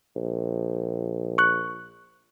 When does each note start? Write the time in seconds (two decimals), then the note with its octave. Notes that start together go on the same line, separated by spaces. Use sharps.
0.16 A#1
1.38 C#6 F#6